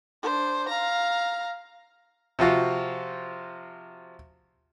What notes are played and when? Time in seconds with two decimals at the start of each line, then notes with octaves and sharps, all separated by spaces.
0.23 D4 C5
0.69 F5 A#5
2.39 C3 F3 F4 F#4